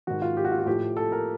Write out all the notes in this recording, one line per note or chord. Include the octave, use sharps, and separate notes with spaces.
G#2 D#3 F#4
F4
G4
F#4
F4
F#4
A2 F3 G4
A4
A#4